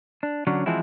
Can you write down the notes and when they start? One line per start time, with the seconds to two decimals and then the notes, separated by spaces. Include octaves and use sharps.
0.23 D4
0.47 D3 F#3 C#4 D4
0.66 E3 F3 G#3 C4 E4 F#4